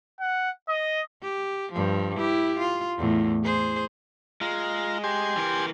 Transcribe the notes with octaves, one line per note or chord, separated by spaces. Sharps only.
F#5
D#5
G4
G2 F3
E4 G4
F4
E2 A2
G#4 C5
G#3 F4 A#5
G4 G#5 C6
E3 A#4